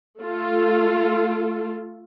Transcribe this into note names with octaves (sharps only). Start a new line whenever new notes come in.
A3 F4 A4